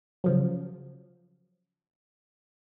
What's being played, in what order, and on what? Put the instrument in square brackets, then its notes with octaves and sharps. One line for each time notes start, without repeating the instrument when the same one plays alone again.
[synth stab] C#3 F3 F#3